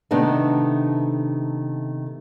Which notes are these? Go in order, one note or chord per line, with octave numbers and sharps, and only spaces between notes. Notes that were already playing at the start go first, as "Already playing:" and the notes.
C3 D#3 A3 B3 D4 D#4